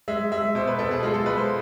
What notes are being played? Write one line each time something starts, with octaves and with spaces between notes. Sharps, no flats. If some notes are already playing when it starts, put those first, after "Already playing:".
G#3 E5
G#3 E5
B2 C5
B4
B2 A4
G#4
G#3 F4
A4
G#3 B4
C5